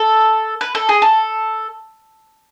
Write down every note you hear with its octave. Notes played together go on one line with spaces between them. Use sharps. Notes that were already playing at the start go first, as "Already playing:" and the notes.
Already playing: A4
B4
A4
G#4
A4